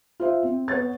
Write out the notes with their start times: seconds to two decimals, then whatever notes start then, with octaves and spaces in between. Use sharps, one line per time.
0.20 F4 C5 E5
0.43 C4
0.68 B3 B4 C#5 A6